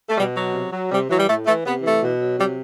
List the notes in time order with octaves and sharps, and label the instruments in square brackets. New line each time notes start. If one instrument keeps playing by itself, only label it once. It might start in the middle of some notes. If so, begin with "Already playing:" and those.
[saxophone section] A3
B2 G3
F#3
C3
F#3
C3 G3
E3 F#3
G3
A2 A3
E3 A3
C3 B3
E3 A3
B2
F#3
C3 G3